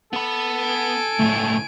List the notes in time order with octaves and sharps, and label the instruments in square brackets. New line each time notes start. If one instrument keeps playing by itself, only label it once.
[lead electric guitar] B3 B5 [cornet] A4
[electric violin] G#5 D7
[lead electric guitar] C#2 A2 [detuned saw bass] A3